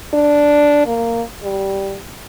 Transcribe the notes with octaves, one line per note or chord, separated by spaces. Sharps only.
D4
A#3
G3